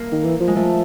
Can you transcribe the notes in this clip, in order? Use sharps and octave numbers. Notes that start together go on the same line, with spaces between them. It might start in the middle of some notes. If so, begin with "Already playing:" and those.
Already playing: A#3
D#3
E3
F3
G#3
F3 A3